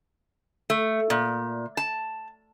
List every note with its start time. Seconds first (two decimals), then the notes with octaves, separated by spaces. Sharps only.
0.70 A3
1.10 A#2
1.77 A5